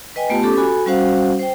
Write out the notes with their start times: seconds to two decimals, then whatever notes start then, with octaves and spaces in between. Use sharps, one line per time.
0.16 B4 D#5 G5 G#5
0.30 A3 B3 F4 G4 A5
0.43 C#4 G4 A4 D6
0.57 F#4 A4 G#5 B5
0.86 G3 C#4 F#4 C5 F5 F#5
1.39 C5 G5